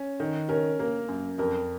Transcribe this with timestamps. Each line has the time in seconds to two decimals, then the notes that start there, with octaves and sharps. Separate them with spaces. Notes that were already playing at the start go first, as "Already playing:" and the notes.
Already playing: C#4
0.20 D#3
0.49 C#4 A#4
0.79 A#3 A#4
1.08 F#2
1.38 F2 A#4